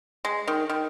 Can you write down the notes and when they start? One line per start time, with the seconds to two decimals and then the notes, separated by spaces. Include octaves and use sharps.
0.25 G#3
0.48 D#3
0.69 D#3